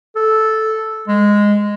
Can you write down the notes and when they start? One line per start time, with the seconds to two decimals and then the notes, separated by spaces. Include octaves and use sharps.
0.16 A4
1.08 G#3